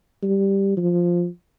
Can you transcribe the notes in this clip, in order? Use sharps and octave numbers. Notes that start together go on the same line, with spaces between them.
G3
F3